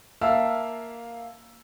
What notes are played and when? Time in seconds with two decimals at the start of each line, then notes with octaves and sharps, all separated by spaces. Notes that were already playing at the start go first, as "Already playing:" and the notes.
0.21 A#3 E5 F5 A5 E6